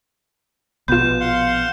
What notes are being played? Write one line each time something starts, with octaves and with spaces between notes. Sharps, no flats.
A#1 B2 B3 F4 B4 G6 E7
F5 F#5 C6